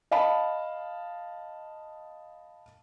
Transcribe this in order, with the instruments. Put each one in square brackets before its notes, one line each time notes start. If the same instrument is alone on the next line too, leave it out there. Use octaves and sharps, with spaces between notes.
[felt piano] D#5 F5 A5 B5